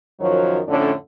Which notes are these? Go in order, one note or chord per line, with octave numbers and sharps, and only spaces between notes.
F#2 D#3 F3 F#3 F#4 C#5
F2 A2 D3 C#4 D4